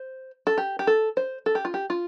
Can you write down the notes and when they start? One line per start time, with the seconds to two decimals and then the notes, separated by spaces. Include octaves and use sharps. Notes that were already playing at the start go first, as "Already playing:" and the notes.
Already playing: C5
0.47 A4
0.58 G4
0.79 G4
0.87 A4
1.17 C5
1.46 A4
1.55 G4
1.65 F4
1.74 G4
1.90 F4